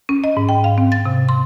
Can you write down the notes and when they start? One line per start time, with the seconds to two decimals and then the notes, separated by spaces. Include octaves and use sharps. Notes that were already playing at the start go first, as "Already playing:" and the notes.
0.09 C#4
0.24 D#5
0.37 G#2
0.49 G5
0.64 F5
0.78 C4
0.92 A6
1.05 C3
1.29 C6